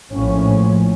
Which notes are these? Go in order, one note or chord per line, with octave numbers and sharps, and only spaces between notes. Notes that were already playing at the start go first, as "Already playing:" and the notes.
A#1 A2 F3 C#4